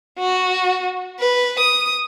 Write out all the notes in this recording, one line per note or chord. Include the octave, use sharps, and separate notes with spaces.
F#4
B4
D#6